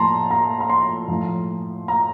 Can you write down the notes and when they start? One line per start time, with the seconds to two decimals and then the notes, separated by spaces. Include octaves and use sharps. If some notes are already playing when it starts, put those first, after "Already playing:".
Already playing: A2 F3 A5 A#5 C6
0.31 A#5
0.60 A#5
0.70 C6
1.08 A2 F3
1.88 A#5